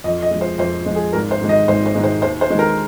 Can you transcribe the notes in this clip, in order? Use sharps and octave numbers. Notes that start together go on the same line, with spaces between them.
F2 D#5
D#5
F3 G#3
C5
F2 C5
F3 G#3
G#4
G#1 A#4
C5
G#2 D#3 G#3
D#5
G#1 C5
C5
G#2 D#3 G#3
C5
D#2 C5
C5
D#3 G#3
A#4